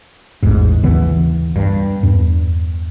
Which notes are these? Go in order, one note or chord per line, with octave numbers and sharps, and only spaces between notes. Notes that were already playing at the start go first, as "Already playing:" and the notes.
A1 E2 G#2
D#2 C#3 E3 B3
G2
E2 G2